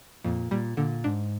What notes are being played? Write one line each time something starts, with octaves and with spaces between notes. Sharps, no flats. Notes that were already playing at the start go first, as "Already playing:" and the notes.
F2 A#2
A#2 G3
A#2 D3
G#2 D4